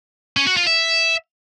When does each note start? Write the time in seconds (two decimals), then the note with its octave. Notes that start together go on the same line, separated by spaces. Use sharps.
0.37 C#4
0.47 F#4
0.57 F4
0.67 E5